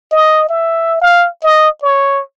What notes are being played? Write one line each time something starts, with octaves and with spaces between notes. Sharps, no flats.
D#5
E5
F5
D#5
C#5